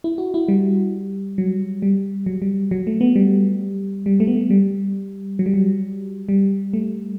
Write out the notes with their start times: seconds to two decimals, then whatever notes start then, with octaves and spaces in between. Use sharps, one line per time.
0.04 E4
0.18 F#4
0.34 E4
0.48 G3
1.38 F#3
1.82 G3
2.26 F#3
2.42 G3
2.71 F#3
2.87 A3
3.01 B3
3.16 G3
4.06 G3
4.20 A3
4.27 B3
4.35 A3
4.50 G3
5.39 F#3
5.46 G3
5.54 F#3
6.29 G3
6.73 A3